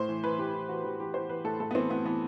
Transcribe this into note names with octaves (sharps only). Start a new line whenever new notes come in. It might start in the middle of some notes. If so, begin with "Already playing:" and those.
Already playing: A2 C5
E3
E3 B4
A2 G4
E3
E3 F#4
E3 G4
E3 G4
E3 C5
E3 B4
A2 A4
A2 A4
B3
E3 C4
A2 B3
E3 B3